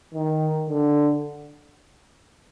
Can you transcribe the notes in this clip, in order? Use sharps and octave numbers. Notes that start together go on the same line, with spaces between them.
D#3
D3